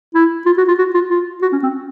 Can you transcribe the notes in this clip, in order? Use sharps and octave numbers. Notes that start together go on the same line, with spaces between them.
E4
F4
F#4
F4
F#4
F4
F4
F#4
C#4
C4